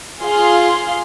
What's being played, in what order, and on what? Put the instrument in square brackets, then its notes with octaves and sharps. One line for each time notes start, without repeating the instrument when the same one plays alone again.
[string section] F4 G#4 F5 C6